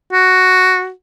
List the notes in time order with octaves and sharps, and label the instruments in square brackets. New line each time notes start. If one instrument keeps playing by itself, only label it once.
[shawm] F#4